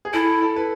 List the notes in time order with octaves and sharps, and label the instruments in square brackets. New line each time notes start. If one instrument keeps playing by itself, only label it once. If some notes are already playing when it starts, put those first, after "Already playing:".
[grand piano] G#4
[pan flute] E4 [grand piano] A4
[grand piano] A4
B4